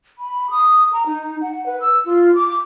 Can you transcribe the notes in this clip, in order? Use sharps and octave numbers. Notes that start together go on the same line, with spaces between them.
B5
D#6
A#5
D#4
F#5
B4
E6
F4
D6